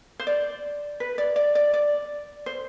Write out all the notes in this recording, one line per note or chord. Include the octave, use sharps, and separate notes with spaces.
C5
D5
B4
D5
D5
D5
D5
C5